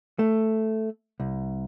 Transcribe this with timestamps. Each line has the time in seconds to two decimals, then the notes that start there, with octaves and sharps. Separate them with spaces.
0.19 A3
1.20 C2